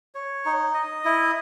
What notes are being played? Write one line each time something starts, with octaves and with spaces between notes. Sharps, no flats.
C#5
D#4
D#5
E4